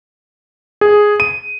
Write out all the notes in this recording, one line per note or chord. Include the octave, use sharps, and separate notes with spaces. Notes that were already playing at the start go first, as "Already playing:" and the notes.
G#4
D#7